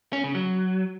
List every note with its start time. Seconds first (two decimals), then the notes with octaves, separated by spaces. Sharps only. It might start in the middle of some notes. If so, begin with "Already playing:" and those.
0.13 C#4
0.24 C#3
0.35 F#3